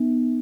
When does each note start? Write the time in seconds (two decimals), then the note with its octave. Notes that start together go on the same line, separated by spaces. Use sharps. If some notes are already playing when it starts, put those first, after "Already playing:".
Already playing: B3 D#4